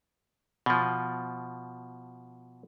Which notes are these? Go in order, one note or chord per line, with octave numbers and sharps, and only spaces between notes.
B2 F3